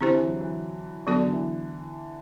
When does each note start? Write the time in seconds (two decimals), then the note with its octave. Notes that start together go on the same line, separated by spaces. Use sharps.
0.01 D3 C4 E4 G4 C5
0.14 E3
0.27 F#3
0.41 E3
1.07 D3 F#3 B3 F#4 A4 D5
1.20 D3
1.33 E3